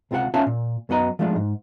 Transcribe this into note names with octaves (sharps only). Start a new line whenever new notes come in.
C#2 C3 F4 A#4 F#5
C#4 F4 C#5 E5 F5 A5
A#2
F#2 F#3 B3 D#5 A#5
F3 G#3 A3 D4 D#4 F4
G#2